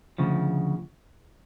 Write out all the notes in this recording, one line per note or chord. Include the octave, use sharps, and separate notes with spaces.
D2 C#3 F3